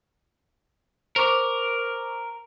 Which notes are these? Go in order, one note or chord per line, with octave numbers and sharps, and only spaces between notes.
A#4 C5 C#6 D6